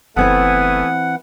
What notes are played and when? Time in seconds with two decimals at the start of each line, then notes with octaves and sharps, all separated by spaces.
0.17 F#1 E3 A3 B3 C4 E4 F#5 G#5